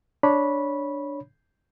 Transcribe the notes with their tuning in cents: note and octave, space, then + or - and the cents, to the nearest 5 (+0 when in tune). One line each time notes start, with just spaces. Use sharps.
D4 +0 C#5 +0 B5 -15